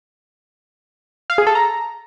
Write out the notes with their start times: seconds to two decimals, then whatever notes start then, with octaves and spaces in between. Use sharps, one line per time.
1.30 F5
1.38 G#4
1.47 A4
1.55 A#5